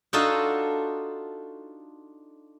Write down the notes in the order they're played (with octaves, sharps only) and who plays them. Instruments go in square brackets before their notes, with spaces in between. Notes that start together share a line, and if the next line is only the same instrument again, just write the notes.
[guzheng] D4 D#4 F4 F#4 A4 D#5